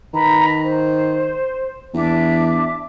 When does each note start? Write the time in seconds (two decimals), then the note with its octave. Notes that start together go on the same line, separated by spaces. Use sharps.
0.13 D#3 B4 A#5 B5
0.64 C5
1.94 E2 D4 E5 D6